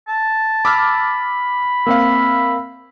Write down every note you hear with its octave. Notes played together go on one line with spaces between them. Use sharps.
A5
B5 D6 E6 F6
A#3 C4 E5 F5